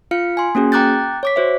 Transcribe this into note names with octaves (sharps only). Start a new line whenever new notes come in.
F4 F5 F6 C#7
G#5 C6
A#3 C#4 F#4 G#4
G5 A#5 D6 F#6 G6 A6
C#5 D6 B6
F#4 C5 E5